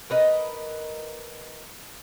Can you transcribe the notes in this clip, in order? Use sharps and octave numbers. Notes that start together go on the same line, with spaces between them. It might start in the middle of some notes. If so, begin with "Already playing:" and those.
A#4 B4 D#5